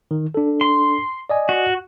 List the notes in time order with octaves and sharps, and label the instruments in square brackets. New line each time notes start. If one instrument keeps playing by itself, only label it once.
[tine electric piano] D#3
D4 A4
[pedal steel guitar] C6
[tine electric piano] D5 D#5 G#5
[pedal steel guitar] F#4